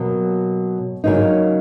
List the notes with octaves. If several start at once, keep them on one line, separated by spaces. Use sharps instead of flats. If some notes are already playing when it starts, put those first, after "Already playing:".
Already playing: B2 F#3 A#3
C#3 F#3 A#3 D#4